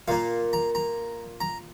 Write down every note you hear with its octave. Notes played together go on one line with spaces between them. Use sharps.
A#2 A#3 F5
A#5
A#5
A#5